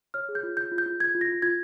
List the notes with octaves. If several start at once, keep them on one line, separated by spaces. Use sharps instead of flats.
C#5 F6
G#4
G6
F4
F4 G6
F4
G6
F4
F4 G#6
F4
A#6
F4
F4 G#6